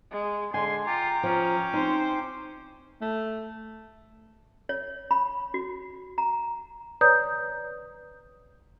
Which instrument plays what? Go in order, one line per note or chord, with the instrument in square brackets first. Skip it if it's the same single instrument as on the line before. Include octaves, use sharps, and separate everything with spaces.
[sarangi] G#3
[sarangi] D3 [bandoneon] G#3 [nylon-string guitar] G#5 [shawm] C6
[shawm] F4 [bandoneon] G5 D6 [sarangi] A#5
[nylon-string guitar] F3 [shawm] C#4
[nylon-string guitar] C4 D#4 [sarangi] C5
[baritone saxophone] A3
[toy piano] C#5
B5
F#4
A#5
[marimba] B4 C#5 D5 A#5 D#6 G6